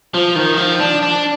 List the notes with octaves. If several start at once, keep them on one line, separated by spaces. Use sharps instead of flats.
F3
D#3
F3
D4
D4